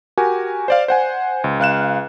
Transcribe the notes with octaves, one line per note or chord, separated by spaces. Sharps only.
F#4 G4 A#4 G#5
C5 D5 F5
C5 F#5 G#5
C#2
C#2 F5 F#6 E7